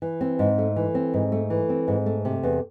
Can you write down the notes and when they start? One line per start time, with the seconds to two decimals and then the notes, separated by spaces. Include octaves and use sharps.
0.02 E3
0.21 C4
0.39 G#2
0.58 A3
0.76 E3
0.95 C4
1.14 G#2
1.32 A3
1.50 E3
1.69 C4
1.88 G#2
2.06 A3
2.25 C3
2.43 E2